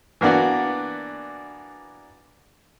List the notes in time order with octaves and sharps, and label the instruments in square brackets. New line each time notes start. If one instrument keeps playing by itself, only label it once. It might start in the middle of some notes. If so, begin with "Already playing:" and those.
[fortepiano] E3 A#3 B3 D4 F#4